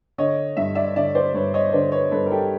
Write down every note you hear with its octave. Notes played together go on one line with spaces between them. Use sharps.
D3 C#5 D#5
G2 E5
D5 E5
D3 D5 E5
C5 D5
G2 B4 C#5
C#5 D#5
D3 C5 D5
B4 C#5
G2 A4 B4
A#4
G4 A4